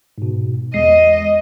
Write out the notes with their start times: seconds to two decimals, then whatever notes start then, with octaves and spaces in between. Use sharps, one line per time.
0.18 G#2 B2
0.74 E2 G#3 D#5 C7